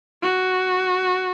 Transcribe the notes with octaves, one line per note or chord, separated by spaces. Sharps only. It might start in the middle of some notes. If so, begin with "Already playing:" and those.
F#4